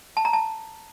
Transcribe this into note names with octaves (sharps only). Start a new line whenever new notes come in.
A5
A#5
A5